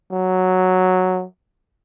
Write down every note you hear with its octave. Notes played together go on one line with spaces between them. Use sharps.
F#3